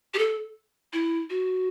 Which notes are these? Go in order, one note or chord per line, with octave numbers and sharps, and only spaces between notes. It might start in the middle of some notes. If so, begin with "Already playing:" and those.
G4
A4
E4
F#4